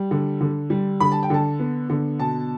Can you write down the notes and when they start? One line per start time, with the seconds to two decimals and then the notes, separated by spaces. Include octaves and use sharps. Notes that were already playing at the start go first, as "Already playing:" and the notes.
Already playing: G3
0.11 D3
0.41 D3
0.70 G3
1.00 D3 B5
1.12 A5
1.23 G5
1.30 D3 A5
1.60 B3
1.90 D3
2.19 B2 A5